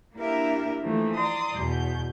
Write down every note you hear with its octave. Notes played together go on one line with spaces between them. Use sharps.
A#3 D4 E4 G4 A#4 E5
E3 F3 A3 A#3
D5 A#5 C6 D#6
E2 B2 G6